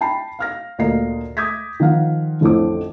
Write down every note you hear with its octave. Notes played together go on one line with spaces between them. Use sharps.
G5 A5 B5 C7
F5 F6 A#6
D2 A#2 A#4 D#5 F5 C7
D6 D#6 G6 G#6 A#6 B6
D#3 F3 F5 F#5
A1 F2 A2 D3 C5 D6